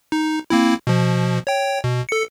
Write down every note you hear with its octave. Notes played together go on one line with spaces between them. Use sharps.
D#4
A#3 C4 E4
B2 F3
C#5 G5
B2
A4 C#7